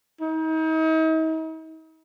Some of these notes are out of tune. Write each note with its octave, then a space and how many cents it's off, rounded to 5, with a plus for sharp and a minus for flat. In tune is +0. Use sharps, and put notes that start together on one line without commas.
D#4 +40